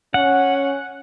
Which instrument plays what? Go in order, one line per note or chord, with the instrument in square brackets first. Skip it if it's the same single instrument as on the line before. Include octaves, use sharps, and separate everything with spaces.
[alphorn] C#4 [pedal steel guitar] F#5